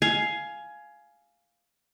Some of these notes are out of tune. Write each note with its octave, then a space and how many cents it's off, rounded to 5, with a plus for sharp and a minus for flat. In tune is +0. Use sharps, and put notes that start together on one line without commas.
F5 +0 G#5 +15